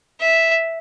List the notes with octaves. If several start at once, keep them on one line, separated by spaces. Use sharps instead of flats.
E5